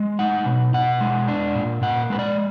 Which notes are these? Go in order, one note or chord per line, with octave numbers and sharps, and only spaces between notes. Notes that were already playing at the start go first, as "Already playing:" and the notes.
Already playing: G#3
D#4 F#5
B2
B2 F#5
G#3
D4
A#2
A#2 F#5
G#3 B4
D5